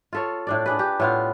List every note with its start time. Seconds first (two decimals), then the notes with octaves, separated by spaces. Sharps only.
0.13 F4 A4 C#5
0.47 A2 D4 D5
0.66 D4 G#4 B4
0.79 G4
1.00 A2 B3 F4